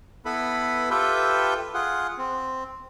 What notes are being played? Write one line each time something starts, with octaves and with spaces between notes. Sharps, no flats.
B3 E4 A4 B4 B5
F4 G4 A4 B4 E5 G5
F4 G#4 F#5
C4